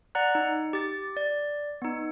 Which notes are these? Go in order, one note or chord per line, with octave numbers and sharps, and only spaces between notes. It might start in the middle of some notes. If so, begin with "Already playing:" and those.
D5 F#5 A#5 F#6
D#4
G4 A6
D5
B3 D#4